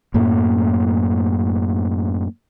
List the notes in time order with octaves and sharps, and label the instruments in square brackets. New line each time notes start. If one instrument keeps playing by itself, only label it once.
[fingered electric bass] F#2 A2 A#3